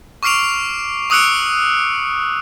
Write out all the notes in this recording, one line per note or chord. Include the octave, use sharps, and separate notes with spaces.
C#6 D6 F6 C7 D7 F7
C#6 D#6 E6 F#6 C#7 D7